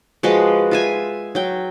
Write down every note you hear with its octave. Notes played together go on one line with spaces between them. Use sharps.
F3 G#3 F#4 B4
F4 E5 G#5
F#3 G5